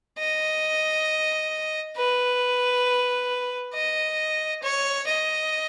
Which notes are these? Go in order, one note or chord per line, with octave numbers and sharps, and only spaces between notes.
D#5
B4
D#5
C#5
D#5